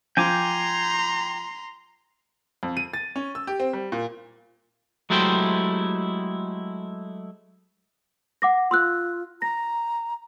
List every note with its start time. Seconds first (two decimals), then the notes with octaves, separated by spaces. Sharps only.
0.17 F3 G5 G#5 A#5 C6 D6
2.63 F2
2.77 D#7
2.94 A6
3.16 C#4
3.35 E6
3.47 G4
3.60 C4
3.73 G3
3.92 A#2
5.10 F#3 G#3 A3 E4 G4 C5
8.42 F#5 D6 A#6
8.71 F4 C6 E6 F#6
9.42 A#5 A#6